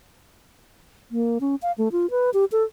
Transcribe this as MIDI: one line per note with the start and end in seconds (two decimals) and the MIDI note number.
1.11 1.38 58
1.41 1.55 61
1.62 1.72 77
1.78 1.89 57
1.92 2.10 65
2.11 2.30 71
2.34 2.45 67
2.52 2.63 69